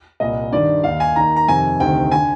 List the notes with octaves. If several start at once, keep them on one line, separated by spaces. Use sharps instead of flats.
C2 A#2 D#5
G2 D#3 D5
D#2 D#3 F5
G#5
D#2 D#3 A#5
A#5
F2 C3 D#3 G#5
D2 C3 D#3 G5
D3 G#5